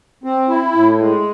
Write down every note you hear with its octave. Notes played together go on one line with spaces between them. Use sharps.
C4
E4
A2
G#3